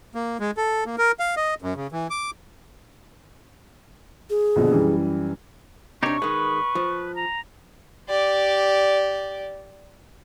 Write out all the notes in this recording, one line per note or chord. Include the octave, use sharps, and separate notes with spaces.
A#3
G#3
A4
A#3
A#4
F5
D#5
F#2
C#3
E3
D6
G#4
A#1 B2 D3
F#2 E3 G3
C3 D4 D#4 G4 C#5 C#6
D#3 G#3 B4
F3
A#5
G4 D5